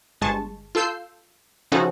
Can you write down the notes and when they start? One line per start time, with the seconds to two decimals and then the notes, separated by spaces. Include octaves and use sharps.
0.21 G1 G#3 A5 C#6
0.75 F4 A4 E6 G6 C7
1.72 C#3 F3 C#4 D#4 F#4 A4